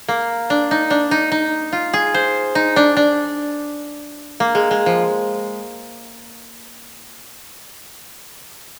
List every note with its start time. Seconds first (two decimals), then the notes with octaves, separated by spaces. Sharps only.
0.08 A#3
0.50 D4
0.71 D#4
0.90 D4
1.11 D#4
1.32 D#4
1.73 F4
1.94 G#4
2.14 C5
2.55 D#4
2.76 D4
2.97 D4
4.40 A#3
4.55 G#3
4.71 G#3
4.86 F3